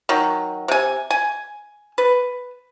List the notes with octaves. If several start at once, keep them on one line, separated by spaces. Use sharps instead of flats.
D#3 F#3
C3 G#5
G#5
B4